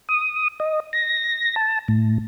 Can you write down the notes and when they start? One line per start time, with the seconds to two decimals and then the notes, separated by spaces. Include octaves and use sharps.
0.09 D#6
0.60 D#5
0.93 A#6
1.56 A5
1.88 A2